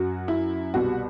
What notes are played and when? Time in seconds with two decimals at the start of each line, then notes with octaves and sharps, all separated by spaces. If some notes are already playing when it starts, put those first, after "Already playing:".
Already playing: F#2 F#3 F#4
0.28 E4
0.74 C2 B2 G3 F#4